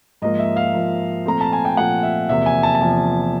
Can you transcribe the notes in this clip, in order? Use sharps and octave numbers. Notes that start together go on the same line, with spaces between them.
G#2 F3 A#3 D#5
E5
F5
G#2 F3 A#3
A#2 F3 A3 C4 A#5
A5
G#5
G5
A#2 F3 A3 C4 F#5
E5
E2 C3 F3 A#3 E5
G#5
A5
A5
E2 C3 F3 A#3 G#5